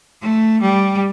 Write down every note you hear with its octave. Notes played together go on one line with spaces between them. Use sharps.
A3
G3